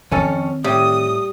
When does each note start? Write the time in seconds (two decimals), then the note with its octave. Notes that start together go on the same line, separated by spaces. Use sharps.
0.11 F2 D#3 C4 C#4 A4
0.64 A2 G3 D#6